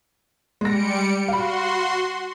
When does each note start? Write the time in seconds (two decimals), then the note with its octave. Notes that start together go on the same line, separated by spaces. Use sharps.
0.61 G3 G#3 A#6 C#7 D7
1.28 F#4 F5 B5 C6